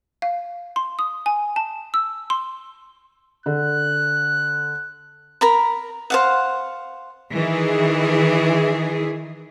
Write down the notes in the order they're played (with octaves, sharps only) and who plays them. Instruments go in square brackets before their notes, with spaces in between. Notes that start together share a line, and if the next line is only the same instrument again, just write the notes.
[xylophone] F5
C6
D#6
G#5
A5
E6
C6
[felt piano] D3 [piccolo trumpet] F#6
[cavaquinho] A#4 A#5 B5
C5 F5 F#5
[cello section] D#3 E3 G#4